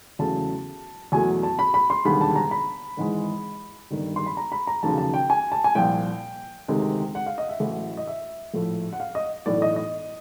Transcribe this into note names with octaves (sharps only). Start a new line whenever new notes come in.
E2 C#3 F#3 A3 A5
E2 B2 F#3 A3 G#5
A5
B5
B5
C6
E1 D#2 D3 G3 B5
A5
A#5
B5
G#1 G#2 E3 G#3
G1 G2 D#3 G3
C6
B5
A#5
B5
A#5
F1 D#2 C#3 F#3 A5
A5
G5
G#5
A5
G#5
C2 A#2 F3 G5
D2 C3 D#3 G#3
F#5
F5
D#5
E5
A1 A2 F#3
D#5
E5
A#1 A2 F3 A3
F#5
F5
D#5
B1 A2 E3 D5
D#5
D#5